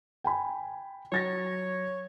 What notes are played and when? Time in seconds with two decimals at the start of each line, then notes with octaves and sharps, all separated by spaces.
0.24 G5 G#5 B5
1.12 F#3 C#5 A6 A#6